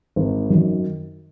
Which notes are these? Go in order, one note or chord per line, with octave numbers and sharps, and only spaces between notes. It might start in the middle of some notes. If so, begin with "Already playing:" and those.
G#1
F#2 D#3 F#3